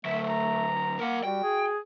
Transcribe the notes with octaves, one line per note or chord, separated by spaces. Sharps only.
D3 F#3 A3 E5
A#5
A#3 A#4 F#5
G3 F#4 G5
G#4